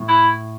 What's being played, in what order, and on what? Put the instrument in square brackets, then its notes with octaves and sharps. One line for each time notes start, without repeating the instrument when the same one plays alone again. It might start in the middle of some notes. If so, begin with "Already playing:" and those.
Already playing: [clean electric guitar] A2
[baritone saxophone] E4